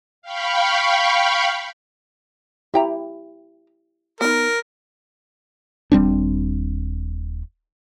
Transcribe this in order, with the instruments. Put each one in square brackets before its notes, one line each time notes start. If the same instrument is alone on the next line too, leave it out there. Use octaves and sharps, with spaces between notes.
[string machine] F5 G5 B5 C#6
[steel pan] E4 G4 [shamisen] E5 G5 A#5
[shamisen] B3 D#4 [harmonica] A#4
[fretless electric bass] D#1 G3 C4 D4